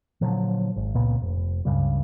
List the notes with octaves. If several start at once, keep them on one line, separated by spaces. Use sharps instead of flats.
A#2 D3 F3 F#3
G#1
C#2 A#2 B3
F1
C#2 G2 C#3 G3